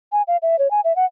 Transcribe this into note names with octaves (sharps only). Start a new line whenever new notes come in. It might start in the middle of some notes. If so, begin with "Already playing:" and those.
G#5
F5
E5
C#5
G#5
E5
F#5